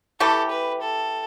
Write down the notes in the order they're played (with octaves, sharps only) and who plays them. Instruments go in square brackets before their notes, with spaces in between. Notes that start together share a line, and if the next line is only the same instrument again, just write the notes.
[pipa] E3 A3 G4 [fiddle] A4
[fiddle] B4
A4